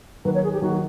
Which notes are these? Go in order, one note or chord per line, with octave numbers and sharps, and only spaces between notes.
D#3 F#3 A#3 B4
C#5
G#4
G4
D#3 F#3 A#3 F#4